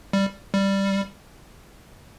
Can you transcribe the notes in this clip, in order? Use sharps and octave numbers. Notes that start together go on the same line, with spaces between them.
G3
G3